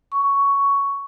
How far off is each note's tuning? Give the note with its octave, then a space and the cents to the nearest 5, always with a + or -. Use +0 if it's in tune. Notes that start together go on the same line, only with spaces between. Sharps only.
C#6 +10